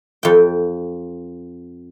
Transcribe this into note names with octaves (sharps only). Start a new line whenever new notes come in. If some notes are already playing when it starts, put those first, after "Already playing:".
F2 G5